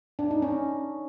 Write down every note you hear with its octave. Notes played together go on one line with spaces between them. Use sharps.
D4
D#4
C#4